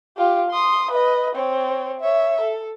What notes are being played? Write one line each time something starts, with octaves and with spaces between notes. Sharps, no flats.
F4 G4
C6 D#6
B4 D#5
C4 C#5
C#5 E5
A4